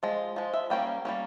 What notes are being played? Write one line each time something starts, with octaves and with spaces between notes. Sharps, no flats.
F3 G#3
F3 G#3
E5
G3 A#3 C#4 G5
G3 A#3 C#4